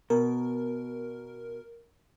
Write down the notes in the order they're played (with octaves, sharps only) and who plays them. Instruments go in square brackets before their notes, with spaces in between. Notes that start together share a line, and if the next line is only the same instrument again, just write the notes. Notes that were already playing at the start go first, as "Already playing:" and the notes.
[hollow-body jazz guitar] B2 [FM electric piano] A#4